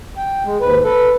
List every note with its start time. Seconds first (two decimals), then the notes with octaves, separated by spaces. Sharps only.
0.17 G5
0.45 G#3
0.61 D#2 G#2 B4
0.84 A4 B4